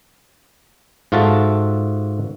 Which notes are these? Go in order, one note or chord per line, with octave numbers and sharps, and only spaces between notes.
G#2 F4 F#4 A4 E5 A5